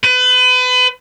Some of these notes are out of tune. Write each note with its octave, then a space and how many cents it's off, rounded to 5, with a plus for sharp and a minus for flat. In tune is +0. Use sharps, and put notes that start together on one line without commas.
B4 +30